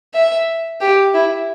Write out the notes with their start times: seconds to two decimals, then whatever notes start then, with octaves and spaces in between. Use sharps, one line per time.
0.14 E5
0.81 G4
1.14 E4